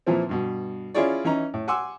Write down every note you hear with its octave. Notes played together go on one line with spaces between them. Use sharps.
A#2 E3 F3 C4
G2 B2
C#4 E4 F4 G#4 C#5 D5
E3 C#4 D#4 A#5
A2
F#5 G#5 C6 D6 E6